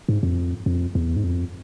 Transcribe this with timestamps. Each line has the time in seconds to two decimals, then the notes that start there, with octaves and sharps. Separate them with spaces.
0.09 G#2
0.23 F2
0.66 F2
0.95 E2
1.16 G#2
1.24 F2